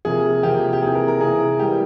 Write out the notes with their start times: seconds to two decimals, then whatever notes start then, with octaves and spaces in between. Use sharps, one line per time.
0.05 C3 F3 A#3 G#4
0.43 C3 F3 A#3 G4
0.73 G4
0.82 C3 E3 A#3 G#4
0.95 A#4
1.08 A#4
1.21 C3 E3 A#3 G#4
1.59 E3 G3 A#3 G4